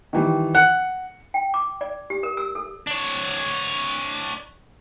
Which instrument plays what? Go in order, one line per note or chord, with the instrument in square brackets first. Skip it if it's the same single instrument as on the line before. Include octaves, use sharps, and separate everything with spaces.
[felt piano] D#3 E3 G3
[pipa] F#5 [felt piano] C#7
[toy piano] G5
D6
D5
G4
A#4
E6
A4
[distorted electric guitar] D4 C#5